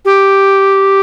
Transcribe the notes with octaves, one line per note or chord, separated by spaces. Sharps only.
G4